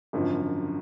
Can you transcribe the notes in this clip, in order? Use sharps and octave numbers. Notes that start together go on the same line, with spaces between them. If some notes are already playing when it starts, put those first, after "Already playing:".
G#1 F#2 D3 F3